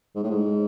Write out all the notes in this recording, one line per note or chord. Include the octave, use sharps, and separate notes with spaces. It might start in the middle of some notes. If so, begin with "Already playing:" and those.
G#2
A2
G#2